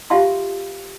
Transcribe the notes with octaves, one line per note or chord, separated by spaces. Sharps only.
F4 G4 E5 F5 A5 C6